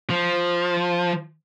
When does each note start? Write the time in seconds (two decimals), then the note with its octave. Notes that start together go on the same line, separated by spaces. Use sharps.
0.10 F3